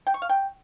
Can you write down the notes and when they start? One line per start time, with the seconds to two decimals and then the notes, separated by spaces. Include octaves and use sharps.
0.07 G5
0.14 C#6
0.22 F5
0.29 G5